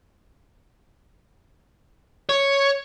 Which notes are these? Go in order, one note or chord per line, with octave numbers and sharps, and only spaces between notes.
C#5